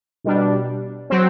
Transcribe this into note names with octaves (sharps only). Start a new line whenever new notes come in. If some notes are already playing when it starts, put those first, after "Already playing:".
B2 G3 D4
F#3 C4